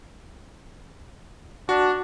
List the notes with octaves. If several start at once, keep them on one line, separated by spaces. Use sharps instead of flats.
D4 F#4